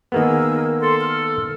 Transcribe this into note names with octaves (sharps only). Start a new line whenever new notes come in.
D#3 A#3 B3 G#4 A#4 E6
A4 C6
F6